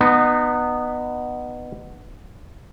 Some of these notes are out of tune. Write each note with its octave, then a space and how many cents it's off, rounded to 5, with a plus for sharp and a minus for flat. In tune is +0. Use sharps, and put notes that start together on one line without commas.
B3 +0 D#4 -30